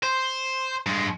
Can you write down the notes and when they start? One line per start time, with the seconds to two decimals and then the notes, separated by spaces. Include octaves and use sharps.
0.03 C5
0.86 G2 G#3